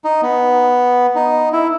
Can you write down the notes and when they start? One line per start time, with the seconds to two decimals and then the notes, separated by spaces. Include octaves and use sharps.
0.04 D#4
0.23 B3
1.15 D#4
1.53 E4